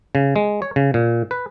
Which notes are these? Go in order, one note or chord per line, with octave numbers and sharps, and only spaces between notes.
C#3
G#3
C#5
C#3
A#2
B4